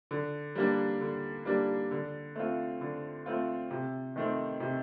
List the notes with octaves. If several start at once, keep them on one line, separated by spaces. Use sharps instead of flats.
D3
G3 A#3 D4
D3
G3 A#3 D4
D3
A3 C4 F4
D3
A3 C4 F4
C3
D#3 A3 C4
C3